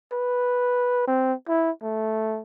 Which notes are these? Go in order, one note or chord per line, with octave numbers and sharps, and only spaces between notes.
B4
C4
E4
A3